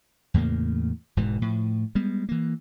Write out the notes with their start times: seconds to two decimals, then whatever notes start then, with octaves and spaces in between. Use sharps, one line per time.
0.34 E2 A2 C#3 A#3
1.17 E1 G#2 B2 E3
1.42 A2 F3
1.95 G3 G#3 B3
2.29 E3 A#3